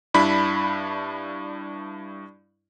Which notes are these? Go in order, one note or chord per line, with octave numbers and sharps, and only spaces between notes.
G2 D4 E4 B5 B6